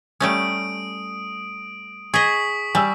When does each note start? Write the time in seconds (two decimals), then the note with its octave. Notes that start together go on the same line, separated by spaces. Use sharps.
0.20 G3 A3 C#4 D#6 D7
2.14 G#4 D#5 C#6 D#6 B6
2.75 G3 G#5 E6